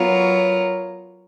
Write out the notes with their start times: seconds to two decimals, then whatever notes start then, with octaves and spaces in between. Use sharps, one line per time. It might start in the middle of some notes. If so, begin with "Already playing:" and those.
Already playing: F#3 B3 F4 A#4 C#5